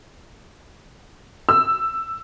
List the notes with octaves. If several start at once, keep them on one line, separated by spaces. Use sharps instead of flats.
E6